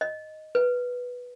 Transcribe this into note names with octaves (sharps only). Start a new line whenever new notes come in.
D#5
B4